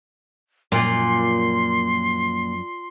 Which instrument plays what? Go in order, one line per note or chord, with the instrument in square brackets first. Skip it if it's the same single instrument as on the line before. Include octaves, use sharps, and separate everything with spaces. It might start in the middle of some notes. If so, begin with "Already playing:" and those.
[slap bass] F#2 F3 [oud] A#2 [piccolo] C6